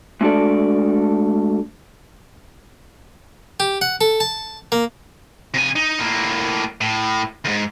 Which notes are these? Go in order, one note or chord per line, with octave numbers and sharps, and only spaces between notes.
G#3 A3 D4 F#4 A4 D5
G4
F#5
A4
A5
A#3
C3 G#5
D#4
A2 A#3
A2
D2 G#2